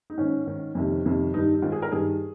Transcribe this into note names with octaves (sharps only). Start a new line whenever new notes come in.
D#4
G#2 D#3 C#4
G#2 D#3
F2 C3 D#3
F2 C3 D#3
G2 D#3 D#4
D#4
G#2 D#3 F4
G#4
A#4
G2 D#3 G#4